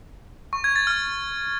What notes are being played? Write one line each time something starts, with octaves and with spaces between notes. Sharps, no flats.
C#6
G#6
A6
F6